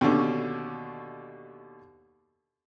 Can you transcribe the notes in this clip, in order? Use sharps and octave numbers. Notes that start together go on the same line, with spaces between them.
D#2 B2 D3 C#4 D4